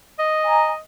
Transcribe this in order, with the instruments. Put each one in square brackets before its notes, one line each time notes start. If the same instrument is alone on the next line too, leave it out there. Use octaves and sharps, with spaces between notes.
[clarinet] D#5
[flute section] G#5 A#5